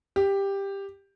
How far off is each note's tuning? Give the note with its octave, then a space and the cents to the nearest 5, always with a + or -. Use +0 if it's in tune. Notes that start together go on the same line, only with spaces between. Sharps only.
G4 +10